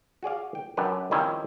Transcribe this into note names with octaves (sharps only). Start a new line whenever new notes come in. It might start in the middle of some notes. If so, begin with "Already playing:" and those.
F#4 G#4 D5 F5
G5
F#2 D4 B4 G5
D#3 F3 G3 C4 C#4 E4